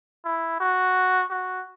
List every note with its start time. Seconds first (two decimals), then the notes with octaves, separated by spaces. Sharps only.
0.25 E4
0.60 F#4
1.31 F#4